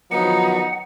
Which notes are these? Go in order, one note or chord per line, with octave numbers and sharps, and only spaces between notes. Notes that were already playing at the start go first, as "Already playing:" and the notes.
D3 D#3 F3 F#3 B3 D#4 F#5